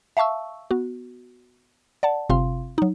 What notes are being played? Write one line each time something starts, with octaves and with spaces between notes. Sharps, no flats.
E5 F5 A5 C#6 E6
B3 F#4
D5 F#5 A5
G1 C3 C4 F4 F5 C6
F#3 D#4